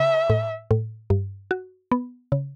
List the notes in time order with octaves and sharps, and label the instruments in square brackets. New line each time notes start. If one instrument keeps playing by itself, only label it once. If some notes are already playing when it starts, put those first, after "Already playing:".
Already playing: [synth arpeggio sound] C#3 [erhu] E5
[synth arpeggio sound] A2
A2
G2
F#4
B3
C#3